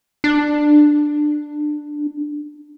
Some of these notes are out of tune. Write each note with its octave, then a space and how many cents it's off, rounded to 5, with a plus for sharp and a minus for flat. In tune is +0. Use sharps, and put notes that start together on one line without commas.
D4 +15